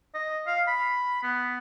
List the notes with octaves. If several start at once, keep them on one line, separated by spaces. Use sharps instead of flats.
D#5
F5
B5
B3